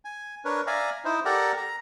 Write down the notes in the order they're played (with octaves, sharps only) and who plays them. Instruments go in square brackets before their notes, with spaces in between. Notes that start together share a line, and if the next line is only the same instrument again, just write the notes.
[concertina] G#5
D4 A#4 B4 C#5
D5 E5 F5 G#5 A#5
D#4 E4 C5
G4 A4 A#4 D5 F#5 A#5
A#5